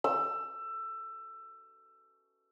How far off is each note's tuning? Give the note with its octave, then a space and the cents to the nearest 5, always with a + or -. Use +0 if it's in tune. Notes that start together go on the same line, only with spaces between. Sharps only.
E6 +20